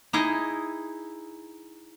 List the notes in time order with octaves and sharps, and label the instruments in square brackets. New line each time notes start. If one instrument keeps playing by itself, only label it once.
[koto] D#4 E4 G#4 D#5